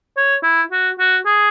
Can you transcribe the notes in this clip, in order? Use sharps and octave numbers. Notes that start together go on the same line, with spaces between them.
C#5
E4
F#4
F#4
G#4